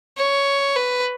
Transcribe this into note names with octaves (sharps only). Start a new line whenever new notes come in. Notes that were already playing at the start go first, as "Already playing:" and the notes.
C#5
B4